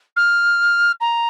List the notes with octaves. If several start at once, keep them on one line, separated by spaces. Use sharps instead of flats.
F6
A#5